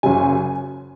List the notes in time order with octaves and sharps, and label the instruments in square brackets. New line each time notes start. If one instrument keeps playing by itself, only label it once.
[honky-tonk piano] F#1 F#2 C#3 G#5